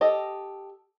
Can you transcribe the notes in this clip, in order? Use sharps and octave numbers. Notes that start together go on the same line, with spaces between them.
G4 A4 D#5